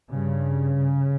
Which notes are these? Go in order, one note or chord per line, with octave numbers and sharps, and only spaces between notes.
G2 C#3